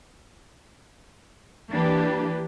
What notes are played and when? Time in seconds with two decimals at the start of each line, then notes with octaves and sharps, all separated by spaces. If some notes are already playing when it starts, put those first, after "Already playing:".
1.70 E3 A#3 D4 G4 B4